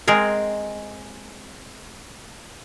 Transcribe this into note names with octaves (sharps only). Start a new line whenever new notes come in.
G#3 C4 G#4 A#4